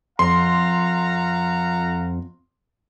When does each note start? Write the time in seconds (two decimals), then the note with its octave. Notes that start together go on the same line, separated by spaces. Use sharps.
0.19 F2 F5 F#5 A#5 C6